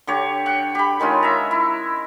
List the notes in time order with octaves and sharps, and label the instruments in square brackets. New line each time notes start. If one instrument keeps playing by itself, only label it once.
[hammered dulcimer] D3 G4 C#5
F#5 G5
G4 B5
D#3 G#3 C#4 F4
E5 A#5
E4